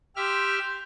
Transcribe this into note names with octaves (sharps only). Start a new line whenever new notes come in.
G4 E5 C6 F6 G6